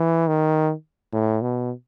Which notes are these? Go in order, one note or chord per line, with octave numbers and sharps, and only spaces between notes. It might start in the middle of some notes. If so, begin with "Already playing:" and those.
Already playing: E3
D#3
A2
B2